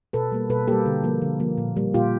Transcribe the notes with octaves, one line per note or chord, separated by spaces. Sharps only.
B2 A4 B4
G3 A#3
B2 A4 B4
G3 A#3 G4 A4
D3
F3 A#3
D3
F3 A#3
A#2
G3 A#3
A#2 F4 G4